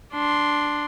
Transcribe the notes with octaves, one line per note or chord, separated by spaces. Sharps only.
D4 C6